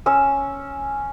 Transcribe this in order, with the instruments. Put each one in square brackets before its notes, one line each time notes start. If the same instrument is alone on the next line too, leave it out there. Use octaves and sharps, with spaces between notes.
[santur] C#4 E6